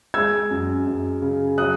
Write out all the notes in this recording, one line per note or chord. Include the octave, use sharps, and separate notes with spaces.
G#3 E6 G#6
F#2
F#2
C#3
F#3 D#6 F#6